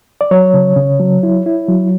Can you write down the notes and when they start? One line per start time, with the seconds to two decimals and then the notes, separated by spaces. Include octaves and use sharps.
0.21 D5
0.31 F#3 C#5
0.54 C#3
0.76 C#3
1.00 F#3
1.23 E4
1.46 E4
1.69 F#3